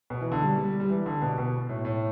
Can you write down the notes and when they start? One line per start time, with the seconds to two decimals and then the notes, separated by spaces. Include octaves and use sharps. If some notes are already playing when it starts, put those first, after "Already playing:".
0.10 B2
0.21 E3
0.32 D3
0.42 G3
0.58 G3
0.80 G3
0.90 E3
1.06 D3
1.22 B2
1.38 B2
1.69 A2
1.85 A2